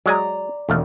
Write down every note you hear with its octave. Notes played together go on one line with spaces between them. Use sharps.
F#3 G#3 D5 G#5 A#5
E1 D#2 A3 F5